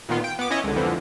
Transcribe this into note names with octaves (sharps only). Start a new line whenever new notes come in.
A#2 D#3 B3 F4
G5
B3 D6
C#4 E4 C#5 D#5
C#2 D3
F2 D3 E3 F3